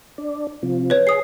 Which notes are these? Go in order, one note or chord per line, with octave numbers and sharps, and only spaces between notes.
D4
C3 F3
B4 C#5
G#4 D#6 C7